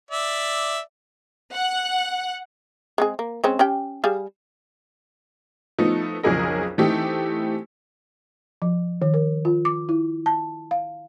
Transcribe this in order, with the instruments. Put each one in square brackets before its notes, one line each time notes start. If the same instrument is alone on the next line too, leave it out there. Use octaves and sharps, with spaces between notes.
[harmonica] D5 E5
[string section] F#5
[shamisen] G#3 C4 G#4
A#3
G#3 C4 C#4
C#4 G4 G5
G3 G#4 F5
[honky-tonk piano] F3 A3 B3 D#4
B1 F2 C#3 G#4 A#4 D#5
E3 A3 C4 D#4 E4 G4
[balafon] F3
D#3
A#4
F4
D6
E4
A5
F5